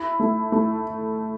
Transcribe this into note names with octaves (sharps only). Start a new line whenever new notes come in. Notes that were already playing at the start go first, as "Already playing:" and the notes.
Already playing: E4
A3
A3